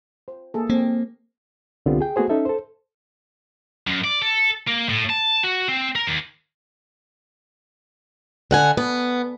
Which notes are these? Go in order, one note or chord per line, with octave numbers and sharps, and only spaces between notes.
C5
A#3 G#4 A4
A#3 C4
C2 D3 B3 C4 F4 G4
G#4 G5
A3 B3 F#4 G#4 C5
C#4 D#4 A4 E5
A4 C5
F#2
D5
A4
A#3
A2
A5
F#4
C4
A#4
D#2
D3 F#5 G#5
B3